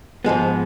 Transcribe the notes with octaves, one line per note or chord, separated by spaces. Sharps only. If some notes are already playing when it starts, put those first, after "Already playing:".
G#2 F3 G#3 B3